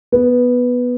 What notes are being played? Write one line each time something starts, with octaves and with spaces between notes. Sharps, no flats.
B3